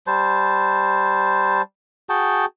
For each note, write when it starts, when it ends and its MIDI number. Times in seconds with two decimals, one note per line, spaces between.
0.07 1.62 55
0.07 1.62 72
0.07 1.62 81
2.09 2.45 66
2.09 2.45 68
2.09 2.45 79
2.09 2.45 81